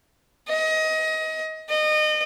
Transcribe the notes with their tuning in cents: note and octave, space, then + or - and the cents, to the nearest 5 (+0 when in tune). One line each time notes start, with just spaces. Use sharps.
D#5 +25
D#5 -30